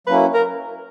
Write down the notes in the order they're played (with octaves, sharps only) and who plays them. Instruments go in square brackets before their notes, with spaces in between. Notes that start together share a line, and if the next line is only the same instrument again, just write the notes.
[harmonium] F#3 A#3 C#4 E4 [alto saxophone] B4
[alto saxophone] A#4